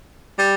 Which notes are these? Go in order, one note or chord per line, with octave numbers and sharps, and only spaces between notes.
G3